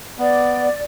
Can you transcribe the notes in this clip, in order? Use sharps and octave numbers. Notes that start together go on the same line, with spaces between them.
B3 D5